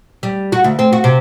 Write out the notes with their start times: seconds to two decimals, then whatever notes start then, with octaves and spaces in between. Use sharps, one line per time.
0.23 G3
0.52 F#4
0.64 D2
0.79 C4
0.92 F#4
1.04 C3